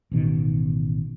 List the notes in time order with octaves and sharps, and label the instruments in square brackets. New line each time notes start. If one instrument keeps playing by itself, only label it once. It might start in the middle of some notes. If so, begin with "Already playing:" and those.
[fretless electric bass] A1 B2 D#3